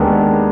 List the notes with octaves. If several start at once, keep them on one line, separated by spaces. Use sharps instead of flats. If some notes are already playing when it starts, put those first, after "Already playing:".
Already playing: D#2 D#3 G#3 B3 D4